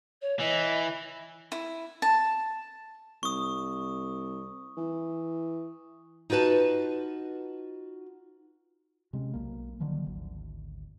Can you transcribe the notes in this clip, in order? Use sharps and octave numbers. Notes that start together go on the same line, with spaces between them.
C#5
E3 D#5
E4
A5
C2 C#6 D#6
E3
D#4 F4 F#4 B4 A5
C3 G#3 C#4
B1 A#3
D3 D#3 F3 F#3
G#1 D2